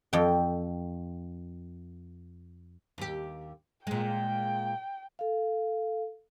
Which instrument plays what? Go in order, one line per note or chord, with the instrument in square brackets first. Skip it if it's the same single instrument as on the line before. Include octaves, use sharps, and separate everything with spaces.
[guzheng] F2 G5
[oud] D#2 G4
[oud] A#2 G#3 [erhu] G5
[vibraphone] A4 F5